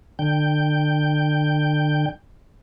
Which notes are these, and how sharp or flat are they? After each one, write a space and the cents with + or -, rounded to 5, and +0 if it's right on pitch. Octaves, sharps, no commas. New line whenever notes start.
D3 +30 G5 +0